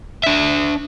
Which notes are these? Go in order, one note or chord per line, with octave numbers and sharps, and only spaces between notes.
D4 E5